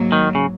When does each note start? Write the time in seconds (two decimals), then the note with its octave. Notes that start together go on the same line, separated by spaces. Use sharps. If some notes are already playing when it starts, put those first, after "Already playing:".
Already playing: G#2 F#3 A#3
0.12 D#3
0.35 C#3